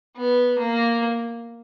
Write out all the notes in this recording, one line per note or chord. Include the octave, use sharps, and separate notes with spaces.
B3
A#3